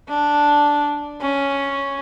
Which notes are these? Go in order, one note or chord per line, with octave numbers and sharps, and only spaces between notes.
D4
C#4